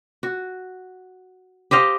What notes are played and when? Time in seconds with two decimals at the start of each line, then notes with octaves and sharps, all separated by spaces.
0.23 F#4
1.71 G4 C5 D#5 F5